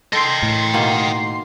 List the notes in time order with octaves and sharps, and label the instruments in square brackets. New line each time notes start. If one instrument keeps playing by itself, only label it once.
[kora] A4 [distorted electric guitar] D#5 G5 [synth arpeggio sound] C6 C7
[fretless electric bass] A2
[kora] B2 D#3 A#3